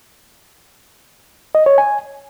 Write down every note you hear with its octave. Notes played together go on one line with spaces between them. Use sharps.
D#5
C#5
G#5